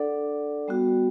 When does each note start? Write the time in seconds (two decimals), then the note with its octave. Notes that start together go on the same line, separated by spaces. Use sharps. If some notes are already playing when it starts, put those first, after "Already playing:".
Already playing: D4 A4 D5 F#5
0.68 G3 B3 F#4